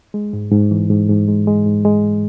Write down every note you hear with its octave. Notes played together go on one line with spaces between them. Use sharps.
G#3
G#2
G#2
E3
G#2
G#2
G#3
G#3
G#2
G#3